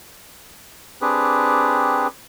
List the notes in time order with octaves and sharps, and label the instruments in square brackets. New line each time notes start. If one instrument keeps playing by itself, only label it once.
[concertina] C4 D4 G4 G#4 B4